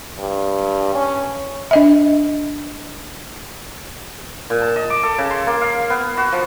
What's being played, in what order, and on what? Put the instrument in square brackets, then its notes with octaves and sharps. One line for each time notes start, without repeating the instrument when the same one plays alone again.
[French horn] G2
C#4
[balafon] D4 D#5 E5
[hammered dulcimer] A#2
A5
D#5
D6
A4
C#3
C6
A#3
F5
B3
F#4
F3